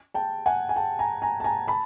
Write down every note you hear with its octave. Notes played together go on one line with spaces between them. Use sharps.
G5 A5
F#5 G#5
G#5
G5 A5
G#5 A#5
G#5 A#5
A5
G#5 A#5
A5 B5